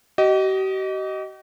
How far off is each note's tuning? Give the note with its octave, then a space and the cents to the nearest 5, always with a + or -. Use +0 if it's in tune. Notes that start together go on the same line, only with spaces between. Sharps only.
G4 -45 D#5 +0